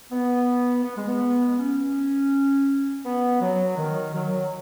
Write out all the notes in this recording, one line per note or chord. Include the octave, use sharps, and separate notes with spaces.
B3
B3
G#3
B3
C#4
B3
F#3
D#3
F#3